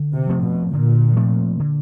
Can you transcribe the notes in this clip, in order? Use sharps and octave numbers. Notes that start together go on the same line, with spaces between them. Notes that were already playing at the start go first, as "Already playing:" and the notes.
Already playing: D3
C3
F3 A3 C4
B2
A#2 D3
F3 A3 C4
D3